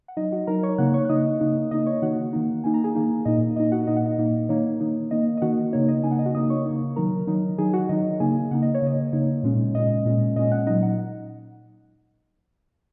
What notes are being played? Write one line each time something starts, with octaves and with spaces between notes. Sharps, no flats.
F#5
F#3 D#4 D#5
F#4 F#5
F#3 D#4 A#4 A#5
C#5 C#6
C#3 A#3 D#4 F#5 F#6
C#5 C#6
F#6
C#3 A#3 D#4 D#5 D#6
C#3 A#3 D#4
C#3 A#3 D#4 D#5 D#6
C#5 C#6
D#3 A#3 D#4 F#4 F#5
D#3 A#3 D#4
D#3 A#3 D#4 G#5
A#5
G#4 G#5
D#3 A#3 D#4
A#2 A#3 D#4 D#5
A#2 A#3 D#4 D#5
F#4 F#5
A#2 A#3 D#4 D#5
F#5
D#5
A#2 A#3 D#4
D#3 A#3 D#4 C#5
D#3 A#3 D#4
D#3 A#3 D#4 D#5
D#5
D#3 A#3 D#4 F#4 F#5
C#3 A#3 D#4 C#5
D#5
C#3 A#3 D#4 G#5
F#5
D#5
F#4 F#5
C#3 A#3 D#4 D#5 D#6
C#5 C#6
C#3 A#3 D#4
D#3 F#3 D#4 A#4 A#5
D#3 F#3 D#4
D#3 F#3 D#4 G#4 G#5
F#4 F#5
D#3 F#3 D#4 D#5
C#3 A#3 D#4 G#4 G#5
C#3 A#3 D#4 F#5
D#5
C#5
C#3 A#3 D#4 D#5
C#3 A#3 D#4 C#5
A#2 G#3 C#4
A#2 G#3 C#4 D#5
A#2 G#3 C#4
A#2 G#3 C#4 D#5
F#5 F#6
A#2 F#3 D#4 D#5
F#5